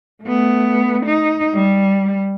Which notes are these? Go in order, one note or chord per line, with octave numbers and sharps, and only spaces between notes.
A3 B3
D#4
G3